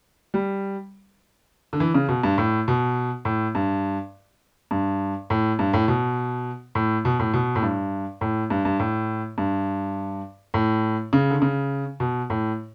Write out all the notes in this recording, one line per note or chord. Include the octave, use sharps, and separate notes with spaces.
G3
D3
E3
C#3
B2
G2
A2
B2
A2
G2
G2
A2
G2
A2
B2
A2
B2
A2
B2
A2
G2
A2
G2
G2
A2
G2
A2
C#3
D3
C#3
B2
A2